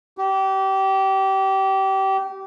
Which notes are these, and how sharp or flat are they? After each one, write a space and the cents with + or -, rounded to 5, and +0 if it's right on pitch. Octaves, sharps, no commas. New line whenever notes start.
G4 -25